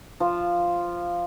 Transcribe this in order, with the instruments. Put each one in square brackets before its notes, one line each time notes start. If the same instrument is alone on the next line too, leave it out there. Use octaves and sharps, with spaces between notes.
[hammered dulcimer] F3